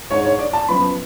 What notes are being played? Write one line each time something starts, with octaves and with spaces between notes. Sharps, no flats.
G#2 G#3 D4 C#5
C#5
D5
A5
F#2 F3 B3 B5